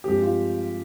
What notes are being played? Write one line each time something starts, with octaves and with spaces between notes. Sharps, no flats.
G2 F3 G#3 C4 G4
F4